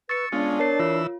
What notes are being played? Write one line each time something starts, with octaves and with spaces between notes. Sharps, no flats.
B4 C#6 E6 A6 C#7
G#3 B3 C#4 D4 F4
A#4 C#5 A5 C7
E3 F4 E6